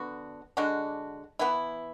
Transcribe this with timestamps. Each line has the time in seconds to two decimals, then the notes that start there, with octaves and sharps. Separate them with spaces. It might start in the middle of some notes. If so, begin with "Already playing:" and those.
Already playing: D3 B3 F#4
0.57 D3 G#3 D4 F#4
1.39 E3 B3 E4